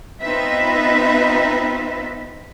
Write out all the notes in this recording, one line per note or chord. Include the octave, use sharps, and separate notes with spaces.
B3 C4 D#4 F4 B4 E5